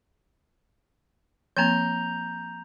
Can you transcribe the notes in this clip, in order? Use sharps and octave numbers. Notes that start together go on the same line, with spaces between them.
F3 A#3 C4 A#5 G6